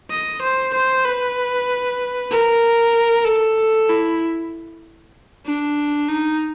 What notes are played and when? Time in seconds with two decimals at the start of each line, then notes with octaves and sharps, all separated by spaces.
0.11 D#5
0.42 C5
0.74 C5
1.05 B4
2.31 A#4
3.25 A4
3.89 E4
5.46 D4
6.08 D#4